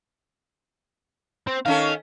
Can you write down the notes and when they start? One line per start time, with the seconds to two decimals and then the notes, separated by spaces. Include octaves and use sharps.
1.47 C4
1.66 D#3 C#4 A4 F5